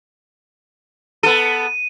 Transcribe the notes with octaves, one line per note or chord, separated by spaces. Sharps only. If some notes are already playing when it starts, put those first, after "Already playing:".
B3 A4 D#7